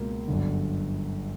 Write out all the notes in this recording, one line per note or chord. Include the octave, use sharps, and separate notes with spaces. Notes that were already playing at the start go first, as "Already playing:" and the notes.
Already playing: C#2 B2 A#3
G1 F#2 D3